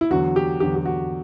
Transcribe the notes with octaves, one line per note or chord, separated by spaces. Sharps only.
E4
E2 D3 F#3 F#4
G4
E2 D3 F#3 G4
G4
F#4